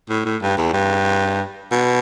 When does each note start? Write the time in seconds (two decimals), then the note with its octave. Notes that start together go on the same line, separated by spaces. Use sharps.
0.09 A2
0.25 A2
0.42 G2
0.57 E2
0.73 G2
1.72 B2